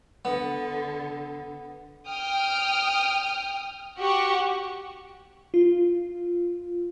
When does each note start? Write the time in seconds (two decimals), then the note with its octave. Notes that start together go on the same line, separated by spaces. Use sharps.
0.25 D3 B3
2.07 G5 D#6 F6
3.99 F#4 G4 F#5 C#6
5.54 F4